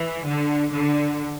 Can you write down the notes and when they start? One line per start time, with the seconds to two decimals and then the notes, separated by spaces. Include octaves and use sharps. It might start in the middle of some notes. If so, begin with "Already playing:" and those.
Already playing: E3
0.26 D3
0.71 D3